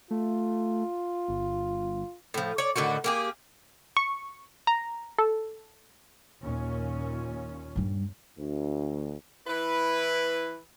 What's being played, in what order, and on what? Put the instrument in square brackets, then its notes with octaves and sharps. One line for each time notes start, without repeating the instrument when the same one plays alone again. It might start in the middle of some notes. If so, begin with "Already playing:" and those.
[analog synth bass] A3 [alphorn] F4
[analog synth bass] G1
[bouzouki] A2 F3
C#5 D5
A2 D3 D#3 F#4
A#3 G4 G#4
[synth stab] C#6
A#5
A4
[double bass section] D#2 A#2 C#4
[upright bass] G2 G3
[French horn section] D2
[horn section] E3 E4 B4